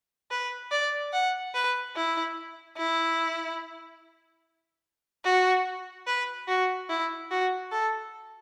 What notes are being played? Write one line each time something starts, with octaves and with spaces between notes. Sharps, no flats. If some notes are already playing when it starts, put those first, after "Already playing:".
B4
D5
F#5
B4
E4
E4
F#4
B4
F#4
E4
F#4
A4